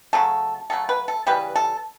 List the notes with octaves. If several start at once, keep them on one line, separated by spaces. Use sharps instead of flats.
C#3 F#3 A3 A4
C#3 F#3 A3 A4
B4
A4
C#3 E3 G3 B4
A4